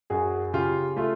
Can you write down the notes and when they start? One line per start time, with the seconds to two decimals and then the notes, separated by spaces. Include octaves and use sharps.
0.10 F#2 F#4 G#4
0.53 C#3 F4 G4
0.97 A3 F4